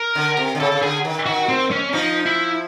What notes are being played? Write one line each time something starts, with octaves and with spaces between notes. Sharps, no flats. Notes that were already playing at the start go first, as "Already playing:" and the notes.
Already playing: A#4
D3
C3
D3
C#3 A4
C#3
D3 G#4
D#3
D#3 F#4
C4
C#4
F3 D#4
E4